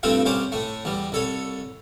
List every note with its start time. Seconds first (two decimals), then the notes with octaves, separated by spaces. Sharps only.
0.03 G2 A3 C4 E4 F4
0.26 C2 C#4 C5 D6
0.52 A2 A3
0.85 E2 G3
1.12 C2 A4 C#5